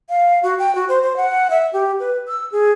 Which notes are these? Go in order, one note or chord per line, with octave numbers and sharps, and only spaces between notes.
F5
F#4
G5
F#4
C5
C5
F#5
E5
G4
B4
E6
G#4